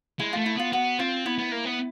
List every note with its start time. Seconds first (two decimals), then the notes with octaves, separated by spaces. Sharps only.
0.19 G#3 E4
0.33 A3 F4
0.46 E4
0.55 B3 F4
0.72 B3 F#4
0.99 C4 F4
1.26 B3 E4
1.38 B3
1.52 A#3
1.65 B3